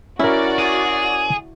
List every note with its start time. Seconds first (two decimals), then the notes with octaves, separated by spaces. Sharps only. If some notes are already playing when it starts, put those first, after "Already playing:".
0.19 C#4 E4 F#4 A#4 D5
0.58 G#4